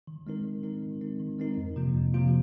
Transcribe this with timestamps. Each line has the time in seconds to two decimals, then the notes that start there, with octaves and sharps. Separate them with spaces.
0.07 D#3
0.27 G#3 C4 D#4 A#4
0.45 D#3
0.63 G#3 C4 D#4 A#4
0.82 D#3
1.01 G#3 C4 D#4 A#4
1.20 D#3
1.39 G#3 C4 D#4 A#4
1.57 F2
1.76 C3 F3 A#3 F4
1.95 F2
2.14 C3 F3 A#3 F4